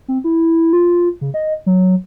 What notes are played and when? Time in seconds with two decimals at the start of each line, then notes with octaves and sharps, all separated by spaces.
0.08 C4
0.24 E4
0.73 F4
1.21 C#3
1.34 D#5
1.66 F#3